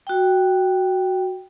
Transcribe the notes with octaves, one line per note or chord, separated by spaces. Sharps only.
F#4 G5